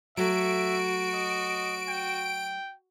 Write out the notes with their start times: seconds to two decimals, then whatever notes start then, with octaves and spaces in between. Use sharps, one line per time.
0.17 F#3 A3 F#4 E5 D7
1.14 D#5
1.89 G5